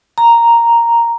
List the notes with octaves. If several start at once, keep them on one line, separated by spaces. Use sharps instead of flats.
A#5